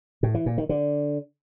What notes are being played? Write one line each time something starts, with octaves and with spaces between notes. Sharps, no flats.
A2
E3
A#2
D#3
D3